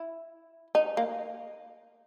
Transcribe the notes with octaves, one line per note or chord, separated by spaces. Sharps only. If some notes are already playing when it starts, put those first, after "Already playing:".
Already playing: E4
D#4
A#3